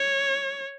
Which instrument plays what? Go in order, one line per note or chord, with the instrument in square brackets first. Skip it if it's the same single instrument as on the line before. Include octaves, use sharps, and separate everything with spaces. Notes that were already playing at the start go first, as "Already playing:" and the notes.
Already playing: [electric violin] C#5